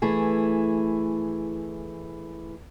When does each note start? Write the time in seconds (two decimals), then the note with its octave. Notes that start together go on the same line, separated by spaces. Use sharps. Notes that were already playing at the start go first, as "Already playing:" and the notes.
0.02 E3 A3 E4 G#4